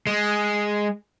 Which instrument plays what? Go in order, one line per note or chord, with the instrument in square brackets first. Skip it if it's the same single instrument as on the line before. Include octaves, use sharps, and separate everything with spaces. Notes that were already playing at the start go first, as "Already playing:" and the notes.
[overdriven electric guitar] G#3